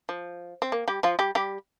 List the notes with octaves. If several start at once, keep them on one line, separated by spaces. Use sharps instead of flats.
F3
C4
A#3
G3 G4
F3 F4
G3 G4
G3 G4